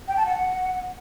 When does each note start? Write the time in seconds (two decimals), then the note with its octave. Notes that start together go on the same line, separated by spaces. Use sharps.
0.08 G5
0.17 A5
0.26 F#5